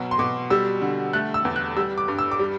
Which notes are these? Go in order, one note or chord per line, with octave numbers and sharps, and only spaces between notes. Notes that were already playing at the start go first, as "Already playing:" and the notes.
Already playing: B2 F#3
C6
B2 D6
G3 E6
D3
A3 F#6
E6
E2
F#6
G3 E6
D6
G2
E6
D6
G3